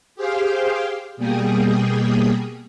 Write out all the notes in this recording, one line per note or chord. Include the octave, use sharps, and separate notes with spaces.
G4 G#4 C5 F5 G5
B2 G3 A#3 G#4 G5 D#6